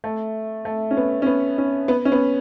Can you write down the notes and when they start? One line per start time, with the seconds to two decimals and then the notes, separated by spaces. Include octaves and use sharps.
0.04 A3
0.65 A3
0.91 C#4
0.97 B3
1.22 C#4
1.26 B3
1.58 C#4
1.88 B3
2.05 C#4
2.12 B3